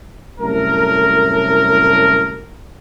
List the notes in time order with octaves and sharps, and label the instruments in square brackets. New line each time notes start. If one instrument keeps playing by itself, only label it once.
[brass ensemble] C2 F#2 A2 A3 A4 A#4